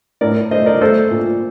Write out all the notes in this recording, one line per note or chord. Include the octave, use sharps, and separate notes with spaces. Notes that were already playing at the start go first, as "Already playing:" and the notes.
A2 A#4 D5
A3 C5 D#5
A#4 D5
A3 A4 C5
A#2